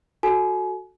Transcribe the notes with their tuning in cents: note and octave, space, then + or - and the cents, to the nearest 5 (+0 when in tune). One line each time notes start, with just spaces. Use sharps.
F#4 +0 A4 +0 G#5 +35